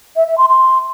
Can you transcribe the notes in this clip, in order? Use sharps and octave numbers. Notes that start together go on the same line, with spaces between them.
E5
E5
C6
C6